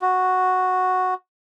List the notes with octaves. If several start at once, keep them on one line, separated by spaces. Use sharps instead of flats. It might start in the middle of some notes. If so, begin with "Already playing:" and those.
F#4